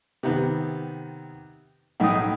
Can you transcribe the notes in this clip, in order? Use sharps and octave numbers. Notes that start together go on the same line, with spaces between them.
C3 D#3 B3
B1 A2 D#4 F#5 G5 D#6